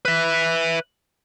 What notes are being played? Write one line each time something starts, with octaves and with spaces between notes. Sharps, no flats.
B4 E5